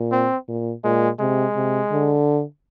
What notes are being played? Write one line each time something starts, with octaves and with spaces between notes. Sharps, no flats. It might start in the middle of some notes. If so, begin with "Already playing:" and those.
Already playing: A#2
C4
A#2
A#2 G#3
C3 G#3
C3
D3